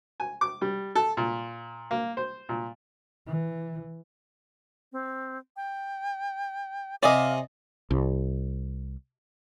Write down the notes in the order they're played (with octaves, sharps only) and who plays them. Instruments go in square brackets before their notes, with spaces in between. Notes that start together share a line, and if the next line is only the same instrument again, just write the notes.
[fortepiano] G#5
D6
G3
A4
A#2
A#3
C5
A#2
[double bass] E3
[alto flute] C4
G5
[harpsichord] C3 G#5 [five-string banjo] D5 D#5 [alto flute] F5
[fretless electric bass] C2